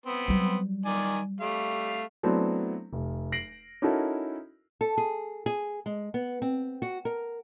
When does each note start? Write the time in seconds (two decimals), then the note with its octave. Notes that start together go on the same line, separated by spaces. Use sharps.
0.06 B3 C4
0.28 F#3 G3
0.85 D#3 D5 G#5
1.40 G3 A3 F5
2.23 F#3 A3 B3 C4 D4 E4
2.93 F1
3.32 A#6 C7 D7 F#7
3.82 C#4 D#4 E4 F#4 A4 A#4
4.81 A4
4.98 G#4
5.46 G#4
5.86 G#3
6.14 B3
6.42 C4
6.82 F#4
7.05 A#4